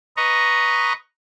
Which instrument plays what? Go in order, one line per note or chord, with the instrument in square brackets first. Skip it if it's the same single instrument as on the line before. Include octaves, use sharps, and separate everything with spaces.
[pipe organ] B4 D#5 A#5 C#6